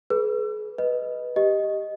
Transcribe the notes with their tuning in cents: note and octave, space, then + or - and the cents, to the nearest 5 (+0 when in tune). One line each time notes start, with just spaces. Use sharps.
G#4 +40 B4 -15
B4 -5 D#5 +0
G4 +0 D#5 +0